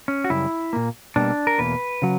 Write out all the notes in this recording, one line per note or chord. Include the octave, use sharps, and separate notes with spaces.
C#4
F#4
F#2 C#3 G3 E4
A#2 A#3
B2 G3 A#3 D4
A#4
E2 B2 A#3 B4
C#3 F#3